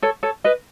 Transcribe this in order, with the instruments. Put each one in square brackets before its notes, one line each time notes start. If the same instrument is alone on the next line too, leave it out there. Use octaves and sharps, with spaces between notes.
[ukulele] A4 C#5
A4 C#5
B4 D#5